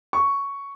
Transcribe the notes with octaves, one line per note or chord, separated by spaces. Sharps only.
C#6